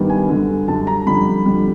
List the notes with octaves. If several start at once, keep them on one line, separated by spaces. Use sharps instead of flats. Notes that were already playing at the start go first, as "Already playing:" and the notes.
Already playing: G2 D#3 G3 B3
G#5
F#2 D3 G3
F#2 D3 G3 A5
A#5
F2 D3 G3 B5
F2 D3 G3